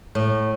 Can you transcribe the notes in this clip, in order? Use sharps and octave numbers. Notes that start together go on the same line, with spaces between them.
A2